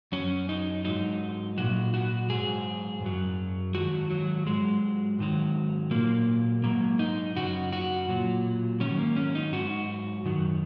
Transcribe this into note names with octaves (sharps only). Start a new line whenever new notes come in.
F#2 F#3 C#4
D#4
G#2 F#3 D#4
A#2 F#3 F#4
F#4
G#2 F#3 G#4
F#2 F#3
G#2 D#3 F#3 F#4
F#3
G#2 F#3 G#3
G#2 D#3 F#3
A#2 F#3 A#3
G#2 F#3 A#3
D#4
F#2 C#3 F#3 F#4
F#4
A#2 F#3
G#2 D#3 F#3 C#4
A#3
C#4
D#4
G#2 F#3 F#4
F#2 D#3 F#3